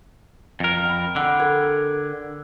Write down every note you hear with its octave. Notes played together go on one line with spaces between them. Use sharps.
F2 A#4
G5 B5
D3 F#5 D7
A4 A#4 G#6